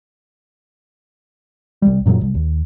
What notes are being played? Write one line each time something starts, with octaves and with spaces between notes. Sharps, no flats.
C2 G3
F#2 A#2 E3 F#3
C2
D#2